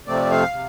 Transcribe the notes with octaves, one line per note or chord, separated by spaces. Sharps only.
F2 C3 F3 A3 C4 D5
F5
C3